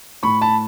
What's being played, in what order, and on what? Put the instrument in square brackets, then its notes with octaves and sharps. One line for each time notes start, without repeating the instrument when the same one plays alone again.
[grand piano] A2 B5 C#6
A5 B5